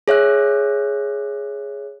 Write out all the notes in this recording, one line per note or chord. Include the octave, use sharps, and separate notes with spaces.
G#4 C#5 E5 F#6